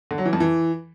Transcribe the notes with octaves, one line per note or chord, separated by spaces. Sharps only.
D3
F#3
E3
F2
E3